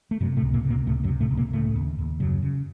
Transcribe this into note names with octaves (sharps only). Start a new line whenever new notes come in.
A3
F#2 C3 F#3
A2 A3
C#2
A#2 A#3
C3
A#2 A#3
C#2 A2 A3
F#2 F#3
C3
A2 A3
C#2
A#2 A#3
A2 C#3 A3
D#2
D#2
F#2 C#3 F#3
C#3